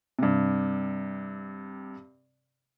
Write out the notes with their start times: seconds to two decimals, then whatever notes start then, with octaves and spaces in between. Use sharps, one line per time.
0.19 G2 C3